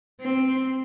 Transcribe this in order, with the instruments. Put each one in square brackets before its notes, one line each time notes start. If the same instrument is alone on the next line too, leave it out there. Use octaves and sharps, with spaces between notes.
[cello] C4